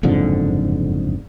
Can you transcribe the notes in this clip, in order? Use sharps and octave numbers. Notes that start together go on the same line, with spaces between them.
F#1 F2 G#2 D3